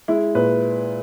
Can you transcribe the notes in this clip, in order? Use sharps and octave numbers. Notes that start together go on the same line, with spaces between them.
G#3 E4
A#2 B4